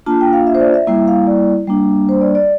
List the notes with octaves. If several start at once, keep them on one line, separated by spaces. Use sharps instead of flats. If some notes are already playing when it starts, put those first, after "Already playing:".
A#3 D4 F4 A5
G5
F5
E5
C5
D5
E5
G3 A#3 E4 E5
F5
D5
G3 A#3 D4
C5
D5
D5